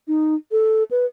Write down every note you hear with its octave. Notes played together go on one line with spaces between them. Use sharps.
D#4
A4
B4